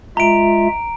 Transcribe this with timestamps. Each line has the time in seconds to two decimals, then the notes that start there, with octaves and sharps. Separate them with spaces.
0.17 G#3 F4 E5 A#5 D7